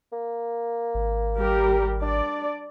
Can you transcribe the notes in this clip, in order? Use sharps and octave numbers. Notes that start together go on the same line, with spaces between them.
A#3
G#1
G3 G4 A#4
D4 D5